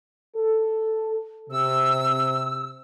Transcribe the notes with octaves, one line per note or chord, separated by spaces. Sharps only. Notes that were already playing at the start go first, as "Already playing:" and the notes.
A4
C3 E6